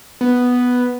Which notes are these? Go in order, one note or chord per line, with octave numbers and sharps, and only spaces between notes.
B3